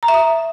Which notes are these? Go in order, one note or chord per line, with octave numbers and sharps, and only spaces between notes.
A#5
E5
D#6